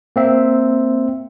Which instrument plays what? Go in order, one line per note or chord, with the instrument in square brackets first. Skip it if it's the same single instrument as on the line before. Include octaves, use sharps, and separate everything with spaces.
[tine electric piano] A#3 C4 E5